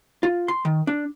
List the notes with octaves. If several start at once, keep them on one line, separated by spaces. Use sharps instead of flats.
F4
C6
D#3
D4